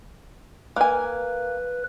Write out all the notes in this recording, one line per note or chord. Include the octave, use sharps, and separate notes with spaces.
A#3 B4 G#5